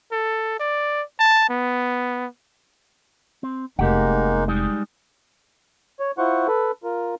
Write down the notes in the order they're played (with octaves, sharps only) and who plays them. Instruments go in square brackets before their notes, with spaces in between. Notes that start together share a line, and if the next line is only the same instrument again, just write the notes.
[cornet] A4
D5
A5
B3
[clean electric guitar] C4
[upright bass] F1 [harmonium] G#3 A#3 D#4 [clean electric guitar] G4 F#5
[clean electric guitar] G3 G#3 D#4
[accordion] C#5
E4 F4 C5 F#5 C#6
A4 B4
F4 A#4